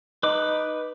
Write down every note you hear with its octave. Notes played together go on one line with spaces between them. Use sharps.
D#4 B4 D6